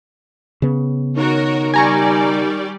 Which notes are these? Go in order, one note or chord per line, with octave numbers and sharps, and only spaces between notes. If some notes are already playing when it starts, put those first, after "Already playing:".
C#3 B3
D#3 F#4 A#4 C#5
G3 D5 G#5 A#5 C#6